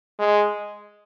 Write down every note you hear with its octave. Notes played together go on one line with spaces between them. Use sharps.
G#3